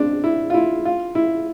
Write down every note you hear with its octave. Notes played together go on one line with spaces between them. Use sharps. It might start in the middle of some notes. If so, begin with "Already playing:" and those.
Already playing: C4 D4
E4
F4
E4
F4
E4